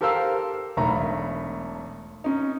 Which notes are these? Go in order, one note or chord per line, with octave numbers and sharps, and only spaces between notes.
G4 A4 A#4 C5 F5 E6
E1 B1 A3 A#5 B5
C#4 D#4